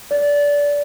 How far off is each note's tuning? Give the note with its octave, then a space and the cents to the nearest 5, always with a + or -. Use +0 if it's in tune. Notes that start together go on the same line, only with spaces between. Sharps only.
D5 -20